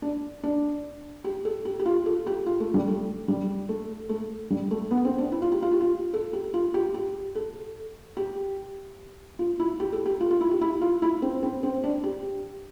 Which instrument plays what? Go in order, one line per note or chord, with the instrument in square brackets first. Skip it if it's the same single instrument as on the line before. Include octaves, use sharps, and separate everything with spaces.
[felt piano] D4
D4
G4
A4
G4
G4
F4
A4
G4
F4
A3
G3
A3
G3
A3
A3
G3
A3
B3
C4
D4
E4
F4
G4
F4
G4
F4
A4
G4
F4
G4
G4
A4
G4
F4
E4
G4
A4
G4
F4
F4
E4
G4
E4
F4
E4
C4
C4
C4
D4
G4